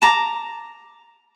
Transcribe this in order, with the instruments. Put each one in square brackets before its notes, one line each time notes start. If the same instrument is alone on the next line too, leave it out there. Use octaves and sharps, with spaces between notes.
[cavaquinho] A5 A#5 D6